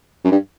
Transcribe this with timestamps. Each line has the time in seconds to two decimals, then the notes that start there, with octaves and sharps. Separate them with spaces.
0.25 F#2
0.32 G2